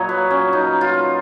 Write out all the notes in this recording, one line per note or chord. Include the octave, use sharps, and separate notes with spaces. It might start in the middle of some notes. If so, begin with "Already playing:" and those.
Already playing: A#2 F#3 C#5 D#5
B4
C#4
D#4
F4